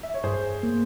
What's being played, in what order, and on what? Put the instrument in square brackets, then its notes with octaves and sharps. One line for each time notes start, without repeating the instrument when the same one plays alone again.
[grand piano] E5
C#5
[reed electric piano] G2 [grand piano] G#4 C5
[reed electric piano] A#3